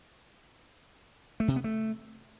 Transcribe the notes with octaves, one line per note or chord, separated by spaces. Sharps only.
A3
C3
B3
A3